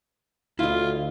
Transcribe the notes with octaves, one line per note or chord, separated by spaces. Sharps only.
D2 E4 F4 D#5